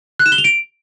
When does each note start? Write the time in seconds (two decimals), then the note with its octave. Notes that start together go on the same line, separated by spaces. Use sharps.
0.19 F#6
0.26 E7
0.32 G7
0.38 F7
0.44 D7